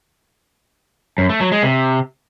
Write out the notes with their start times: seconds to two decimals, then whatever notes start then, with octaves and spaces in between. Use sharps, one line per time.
1.18 F#2
1.29 A3
1.41 F#3
1.52 G#3
1.63 C3